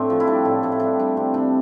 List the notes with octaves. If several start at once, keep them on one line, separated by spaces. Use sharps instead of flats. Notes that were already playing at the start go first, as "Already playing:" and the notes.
Already playing: A2 A3 C4 D4
F3
E4
G3 D4
A2
A2 D4
E4
G3 D4
G3 D4
C3 C4
C3 D4